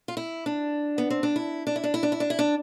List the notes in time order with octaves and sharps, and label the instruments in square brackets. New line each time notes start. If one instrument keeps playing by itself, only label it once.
[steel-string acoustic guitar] F4
E4
D4
B3
C4
D4
E4
D4
E4
D4
E4
D4
E4
D4
E4
D4